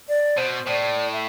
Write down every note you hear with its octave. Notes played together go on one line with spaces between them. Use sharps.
D5
B2 C5
A2 D5
E5